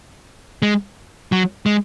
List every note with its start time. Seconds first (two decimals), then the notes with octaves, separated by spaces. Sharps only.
0.62 G#3
1.32 F#3
1.66 G#3